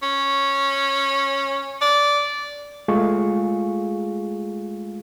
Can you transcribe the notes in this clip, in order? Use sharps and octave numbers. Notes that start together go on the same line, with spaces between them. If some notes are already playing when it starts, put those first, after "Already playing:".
C#4
D5
G#3 A3 F4 G#4 F5 C#6